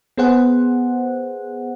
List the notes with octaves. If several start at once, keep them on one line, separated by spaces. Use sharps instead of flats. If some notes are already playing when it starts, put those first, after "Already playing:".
B3 G#4 C5 F#5